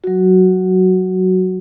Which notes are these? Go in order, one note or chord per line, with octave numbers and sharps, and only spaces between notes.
F#3 F#4